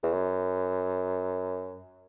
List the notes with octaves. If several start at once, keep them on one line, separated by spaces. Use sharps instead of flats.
E2
F#2